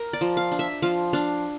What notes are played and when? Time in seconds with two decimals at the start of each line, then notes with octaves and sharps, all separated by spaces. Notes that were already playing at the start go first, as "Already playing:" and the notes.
Already playing: A#4
0.13 D5
0.21 F3
0.37 F5
0.52 D4
0.59 E5
0.82 F3 F5
1.13 D4 F5